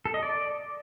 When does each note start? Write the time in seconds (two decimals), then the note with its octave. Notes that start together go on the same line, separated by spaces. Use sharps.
0.05 A4
0.14 D#5
0.23 D5